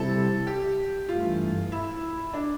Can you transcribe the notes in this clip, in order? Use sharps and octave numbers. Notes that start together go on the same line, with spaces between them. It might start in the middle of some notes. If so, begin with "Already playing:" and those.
Already playing: C3 G3 C4 E4 A4
G4
G2 E3 A3 F4
E4
D4